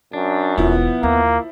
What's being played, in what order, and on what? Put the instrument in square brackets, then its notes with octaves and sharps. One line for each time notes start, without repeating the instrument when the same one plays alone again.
[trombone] F#2 [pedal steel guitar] D4
[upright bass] E1 [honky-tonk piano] F3 E4 [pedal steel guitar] B3
[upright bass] D#2 D3 [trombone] A#3